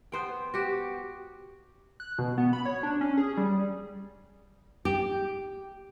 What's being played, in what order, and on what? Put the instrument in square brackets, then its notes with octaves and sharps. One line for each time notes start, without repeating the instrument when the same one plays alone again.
[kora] B3 C5 G5
F#4 G4
[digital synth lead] F#6
B2
B3
B5
C#5
D4
C#4
G#4
G3
[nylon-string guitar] G4